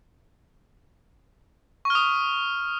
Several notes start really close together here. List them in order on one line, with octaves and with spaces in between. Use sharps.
C#6 F6 D#6